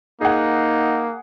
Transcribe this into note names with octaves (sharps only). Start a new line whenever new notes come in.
A#3 D#4 G#4 F#5